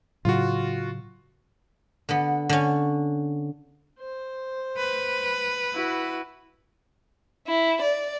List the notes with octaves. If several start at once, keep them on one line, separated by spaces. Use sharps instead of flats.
A2 C#3 F#3 F4 F#4
D3 B3
D3 C#4
C5
B4
E4 F#4
E4
D5